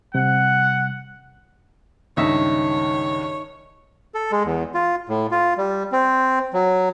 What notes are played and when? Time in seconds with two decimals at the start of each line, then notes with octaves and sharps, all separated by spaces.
0.14 C3 G3 F#5
2.17 C#2 G2 D#3 D#4 C#5 E5
4.15 A4
4.32 G#3
4.45 E2
4.74 F4
5.09 A2
5.31 F4
5.58 G3
5.92 C4
6.53 F#3